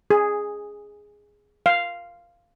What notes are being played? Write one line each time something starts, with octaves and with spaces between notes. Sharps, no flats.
G#4
F5